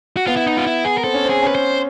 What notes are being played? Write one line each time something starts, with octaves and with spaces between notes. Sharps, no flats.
F#4
B3 F4
E4
D#4
F4
E4
G#4
A#4
C4 A4
C#4
C4
G#4
C#4 B4
C5